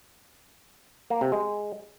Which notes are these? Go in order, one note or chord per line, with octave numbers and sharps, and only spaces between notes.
A#3
C3
G#3